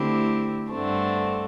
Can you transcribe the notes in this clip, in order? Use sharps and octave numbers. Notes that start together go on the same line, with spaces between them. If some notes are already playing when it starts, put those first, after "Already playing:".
Already playing: D3 A3 C4 E4 G4
G2 D3 A3 C4